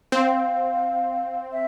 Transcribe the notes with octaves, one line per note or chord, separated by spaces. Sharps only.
C4 F5
E5